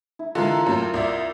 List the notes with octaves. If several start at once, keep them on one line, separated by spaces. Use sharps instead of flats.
E4
D3 E3 G#3 F4 A#4
F#2 A2
C2 D5 E5